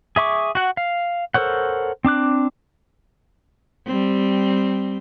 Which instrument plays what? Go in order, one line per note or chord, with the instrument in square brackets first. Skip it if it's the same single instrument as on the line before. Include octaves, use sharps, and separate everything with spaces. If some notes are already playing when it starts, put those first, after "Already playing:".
[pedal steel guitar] G#4 E5 C#6 D6
F#4 F#5
F5
A4 A#4 C5 C#5 F#5
C4 D4 D6 F#6
[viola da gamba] G3 C4